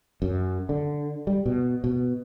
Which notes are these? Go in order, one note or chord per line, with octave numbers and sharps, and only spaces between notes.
F#2
D3
G3
B2
B2